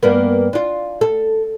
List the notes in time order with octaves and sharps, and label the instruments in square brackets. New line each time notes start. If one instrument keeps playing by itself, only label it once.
[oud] G2 A#3 B3
D4 F4
A4